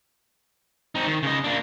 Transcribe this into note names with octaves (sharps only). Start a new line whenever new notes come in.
C4 D#4
D#3
C#3 D#5
A#3 D4